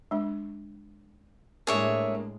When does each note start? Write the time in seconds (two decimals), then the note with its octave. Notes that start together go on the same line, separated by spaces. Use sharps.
0.11 G#3 D4
1.67 A2 G#3 A#3 D4 G#4 C#5 E5